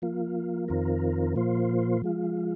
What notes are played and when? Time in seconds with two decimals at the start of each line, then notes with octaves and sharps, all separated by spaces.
0.02 F3 A#3 F4
0.68 F2 D#3 C4 F4 A#4
1.36 A#2 F3 A#3 F4 C5
2.02 F3 G#3 F4